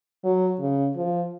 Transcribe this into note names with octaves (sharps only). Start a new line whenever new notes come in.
F#3
C#3
F3